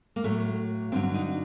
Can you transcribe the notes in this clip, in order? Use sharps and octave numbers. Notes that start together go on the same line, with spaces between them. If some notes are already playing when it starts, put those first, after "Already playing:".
A#3
A2 F#3 A3
G2 D3 F#3 C4
D#4